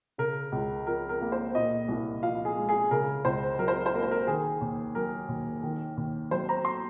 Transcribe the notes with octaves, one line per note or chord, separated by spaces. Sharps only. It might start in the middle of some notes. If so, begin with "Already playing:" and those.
C#3 A#4
C#2
F3 A#4
A#4
A#3
C5
A#2 D#5
C2
F3 F5
G#4
G#3
G#4
C#3 A#4
C#2 C5
F#3 A#4
C5
A#4
C5
A#3 A#4
C5
A#4
D#3 G#4
D#2
F#3 A#4
D#2
D#3
D#2
F#3 C5
A#5
C6